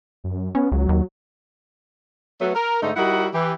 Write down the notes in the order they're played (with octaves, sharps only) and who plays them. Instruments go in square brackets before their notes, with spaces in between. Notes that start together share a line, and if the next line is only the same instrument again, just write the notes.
[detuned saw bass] F#2
[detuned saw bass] B3 [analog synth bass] C#4
[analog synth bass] C#2 [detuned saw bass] F#3
[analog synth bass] D#2
[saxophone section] F#3 A3 B3
A#4
G#2 D3 A3 D#4
G3 D#4 E4 F#4 A#4 F#5
E3 G4